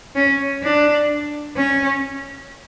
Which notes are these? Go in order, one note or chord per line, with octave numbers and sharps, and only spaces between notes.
C#4
D4
C#4